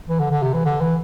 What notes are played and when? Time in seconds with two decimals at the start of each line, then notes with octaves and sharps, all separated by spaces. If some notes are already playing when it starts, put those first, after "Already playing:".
0.09 E3
0.20 D3
0.31 D3
0.43 C3
0.54 E3
0.65 D3
0.81 E3